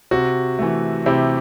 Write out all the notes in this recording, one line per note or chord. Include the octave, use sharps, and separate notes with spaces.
C3 F#4
E3 A3
C3 E4 G4